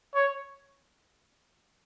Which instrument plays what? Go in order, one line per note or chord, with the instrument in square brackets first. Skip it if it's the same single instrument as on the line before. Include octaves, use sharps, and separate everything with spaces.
[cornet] C#5